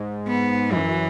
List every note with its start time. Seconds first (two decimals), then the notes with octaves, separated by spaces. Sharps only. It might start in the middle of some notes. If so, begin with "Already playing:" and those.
Already playing: G#2
0.28 B3
0.72 F#2 E3